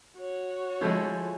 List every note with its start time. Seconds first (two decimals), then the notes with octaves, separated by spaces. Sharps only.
0.16 F#4 C#5
0.81 D3 F3 G#3 A3 E4 G6